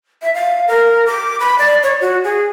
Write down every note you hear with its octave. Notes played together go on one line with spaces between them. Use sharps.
E5
F5
A#4
D6
B5
D5
C#5
F#4
G#4